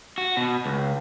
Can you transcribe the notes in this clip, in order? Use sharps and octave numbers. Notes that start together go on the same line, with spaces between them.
F#4
B2
C#2